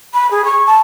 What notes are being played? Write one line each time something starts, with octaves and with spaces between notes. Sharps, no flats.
B5
G#4
C#6
A5